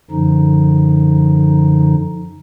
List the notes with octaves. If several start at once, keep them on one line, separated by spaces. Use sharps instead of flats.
F#2 D3 F3 D#4